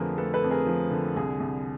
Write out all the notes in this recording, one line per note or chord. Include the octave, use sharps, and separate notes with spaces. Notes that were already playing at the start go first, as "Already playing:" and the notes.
Already playing: F2 D3 F3 A3 G#4 A#4 B4
A3 A4 B4
A4 B4
F2
G#4 A#4
F3
D3
C2 G#4
C2